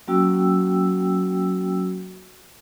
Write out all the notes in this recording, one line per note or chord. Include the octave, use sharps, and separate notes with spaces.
F#3 A#3 C#4 F#4 G5 E6